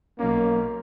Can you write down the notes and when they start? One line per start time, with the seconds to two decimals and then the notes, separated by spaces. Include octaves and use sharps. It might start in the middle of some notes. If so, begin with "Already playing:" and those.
0.19 B1 A#3 C#4